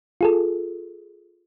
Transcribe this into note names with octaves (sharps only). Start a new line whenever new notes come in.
F4 G#4 A4